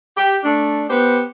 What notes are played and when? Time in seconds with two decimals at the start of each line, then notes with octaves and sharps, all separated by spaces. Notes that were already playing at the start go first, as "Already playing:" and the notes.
0.16 G4
0.44 A3 D4
0.90 B3 G4 C5